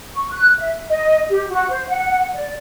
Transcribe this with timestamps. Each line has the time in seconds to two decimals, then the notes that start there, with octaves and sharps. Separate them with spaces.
0.15 C#6
0.31 F#6
0.59 E5
0.89 D#5
1.29 G4
1.49 F#4
1.69 C5
1.88 F#5
2.33 D5